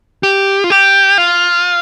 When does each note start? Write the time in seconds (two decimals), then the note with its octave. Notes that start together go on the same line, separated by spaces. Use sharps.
0.23 G4
0.64 F4
0.70 G4
1.18 F4